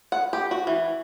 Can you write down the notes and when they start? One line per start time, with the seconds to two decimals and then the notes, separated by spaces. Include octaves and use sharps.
0.12 F#5
0.33 G4
0.51 F#4
0.67 E3